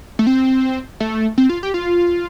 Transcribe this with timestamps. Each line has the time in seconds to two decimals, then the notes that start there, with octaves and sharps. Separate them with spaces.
0.19 A3
0.27 C4
1.00 A3
1.38 C4
1.49 F4
1.63 G4
1.74 F4